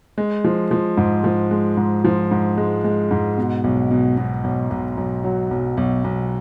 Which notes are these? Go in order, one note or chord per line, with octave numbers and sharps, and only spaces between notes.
G#3
F3
F3
G#2
F3
G#3
G#2
F3
G#2
G#3
G#3
G#2
B2
B1
B2
B2
B1
B1
B1
F#3
B1
B1
B1